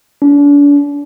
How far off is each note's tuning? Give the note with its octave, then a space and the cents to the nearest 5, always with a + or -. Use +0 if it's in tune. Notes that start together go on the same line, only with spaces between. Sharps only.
D4 -40